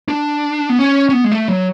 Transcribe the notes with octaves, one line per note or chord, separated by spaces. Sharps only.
D4
B3
C#4
C#4
B3
G#3
A3
F#3